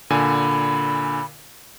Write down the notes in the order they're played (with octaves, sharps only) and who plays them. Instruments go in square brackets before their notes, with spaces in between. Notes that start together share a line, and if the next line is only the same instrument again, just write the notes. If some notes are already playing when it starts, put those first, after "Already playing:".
[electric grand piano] A#2 D3 G#5 [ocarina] B5